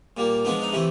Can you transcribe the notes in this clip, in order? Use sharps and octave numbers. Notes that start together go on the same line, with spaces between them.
A#2 G3 A#3
F3 G#3 B3 D4
D#4
C3 E3 A3 E4